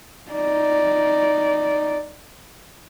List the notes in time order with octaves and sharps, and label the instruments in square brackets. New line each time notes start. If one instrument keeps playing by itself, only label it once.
[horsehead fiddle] D#4 D5